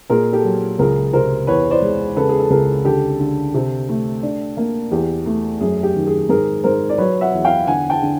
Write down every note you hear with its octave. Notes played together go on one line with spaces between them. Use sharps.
A#2 G#4 A#4
G4 A4
F#3
C#2 G#4 A#4
C3 A#4 C5
E2 B4 C#5
C5 D5
G#3
C#3 A4 B4
G#4
A4
C#2 G#4 A#4
D3 G4 A4
D3
C3
A3
D4
A#3
E2 G4
A3
F#2 G#4
G4
D#3
G#4
G#2 G#4 A#4
G#2 A#4 C5
D5
F#3 B4 C#5
E5 F#5
E2
F5 G5
D3 F#5 G#5
G5 A5
D3